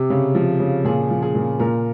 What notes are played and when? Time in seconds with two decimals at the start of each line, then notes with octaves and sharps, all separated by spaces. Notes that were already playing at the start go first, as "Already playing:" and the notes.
Already playing: C3
0.10 C#3
0.35 F3
0.60 C#3
0.84 A#2 G#4
1.10 F3
1.23 G#4
1.35 A#2
1.60 A#2 A#4